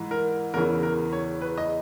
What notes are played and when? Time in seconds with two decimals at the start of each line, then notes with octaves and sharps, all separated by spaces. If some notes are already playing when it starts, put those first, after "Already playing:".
Already playing: G#2 E3
0.11 A#4
0.54 E2 C#3 E3 A#4
0.83 A#4
1.12 C#5
1.41 B4
1.58 D#5